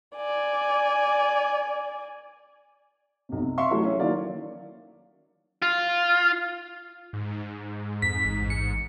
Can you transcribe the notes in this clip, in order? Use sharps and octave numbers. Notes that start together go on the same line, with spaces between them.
D5 G#5
B1 C3
C3
E5 F5 C6 C#6
E3 F#3 A3
C#4
D#3 E3 F#3 A#3 D5 F5
F4
G#2
F2 B6
A1
C#7